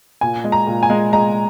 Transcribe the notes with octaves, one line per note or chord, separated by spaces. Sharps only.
A#2 G#5
G#3
A#5
A#2
G#5
G#3
G#3 A#5